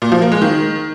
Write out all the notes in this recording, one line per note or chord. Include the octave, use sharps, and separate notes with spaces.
A#2
F3
A#3
G#3
D#3